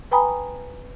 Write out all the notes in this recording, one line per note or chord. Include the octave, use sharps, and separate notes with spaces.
B4 G5 G#5 A#5 B5 D#6